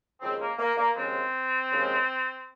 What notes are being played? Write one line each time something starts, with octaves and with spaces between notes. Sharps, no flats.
D#2 C#3 F3 G#3 C4
A#3
A#3
A#3
D#2 C#3 F3 G#3 C4
D#2 C#3 F3 G#3